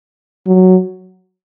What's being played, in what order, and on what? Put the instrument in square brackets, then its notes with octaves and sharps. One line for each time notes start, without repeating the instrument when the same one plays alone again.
[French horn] F#3